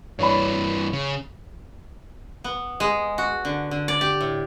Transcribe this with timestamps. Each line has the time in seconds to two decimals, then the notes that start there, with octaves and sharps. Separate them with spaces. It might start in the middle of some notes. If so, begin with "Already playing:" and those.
0.19 G2 E3 C#5 D5 B5
0.93 C#3
2.44 B3
2.80 G#3
3.18 F#4
3.45 D3
3.71 D3
3.88 D5
4.01 G4
4.21 A2